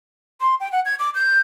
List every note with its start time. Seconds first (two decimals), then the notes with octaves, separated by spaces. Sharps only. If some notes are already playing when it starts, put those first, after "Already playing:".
0.41 C6
0.60 G5
0.72 F#5
0.85 G#6
0.99 D6
1.15 G6